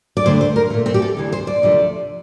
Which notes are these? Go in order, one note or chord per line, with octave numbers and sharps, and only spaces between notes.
D5
D2 D3 A3 C5
C5
A#4
A#2 A3
C4
G4
A4
D2 C3 E3
C5
D5
D2 C3 F3 A3